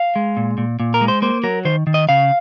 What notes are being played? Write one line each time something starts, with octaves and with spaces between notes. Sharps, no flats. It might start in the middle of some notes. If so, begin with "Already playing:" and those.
Already playing: F5
G#3
A#2
A#2
A#2
A#4
G#3
C5
A#3 C5
F#3 A#4
D#3 C5
D#3
D#5
C#3 F5